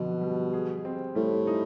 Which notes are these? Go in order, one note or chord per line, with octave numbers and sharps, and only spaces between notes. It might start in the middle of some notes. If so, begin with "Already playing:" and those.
Already playing: F2 B2 D3 B3
G3
G#4
C4
A2 G3
D#4